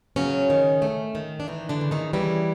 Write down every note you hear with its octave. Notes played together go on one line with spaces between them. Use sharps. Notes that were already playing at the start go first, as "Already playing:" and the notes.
C#3 F#3 C#4
D#3
A3
D#3
D4
D#3 E3 D#4
D3 D4
C#3
D#3 D#4
E3 G3 E4